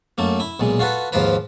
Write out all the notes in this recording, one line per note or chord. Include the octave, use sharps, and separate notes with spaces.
F#2 A3 A#3
E4
B1 A#2 G#3
F4 F#4 A4 B4
D#2 G#2 F3 F4 A#4 B4